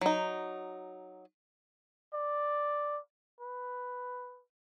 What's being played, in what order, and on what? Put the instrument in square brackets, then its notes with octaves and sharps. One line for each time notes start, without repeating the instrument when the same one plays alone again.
[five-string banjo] F#3 D#4
[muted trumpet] D5
B4